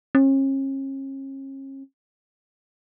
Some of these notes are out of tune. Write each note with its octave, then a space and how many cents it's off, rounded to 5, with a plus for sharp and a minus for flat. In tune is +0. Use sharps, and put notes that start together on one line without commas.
C#4 -40